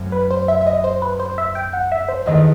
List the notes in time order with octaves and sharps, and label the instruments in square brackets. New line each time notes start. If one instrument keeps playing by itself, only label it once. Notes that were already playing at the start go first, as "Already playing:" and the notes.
Already playing: [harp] F#2 F#3 A3 C4
[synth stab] B4
C5
E5
E5
D#5
C5
B4
C5
E5
G5
F#5
E5
C5
[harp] E2 D#3 A3 [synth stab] D#5